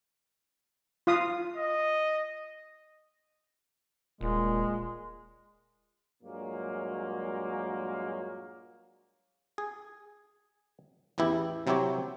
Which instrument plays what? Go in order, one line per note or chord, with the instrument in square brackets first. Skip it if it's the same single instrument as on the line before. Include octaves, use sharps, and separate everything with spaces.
[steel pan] F4 F5 D#6
[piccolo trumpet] D#5
[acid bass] D#1 [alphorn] A#2 [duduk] G#3
[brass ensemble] G2 A#2 F#3 G#3 A#3
[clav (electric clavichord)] G#4
A1 E2 E3 E4 G4
C3 F#3 C4 E4 G4 C#5